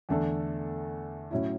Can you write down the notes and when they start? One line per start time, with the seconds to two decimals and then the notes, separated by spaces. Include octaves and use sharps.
0.09 E2 D3 A3 D4 A4
1.31 A2 F#3 C#4 E4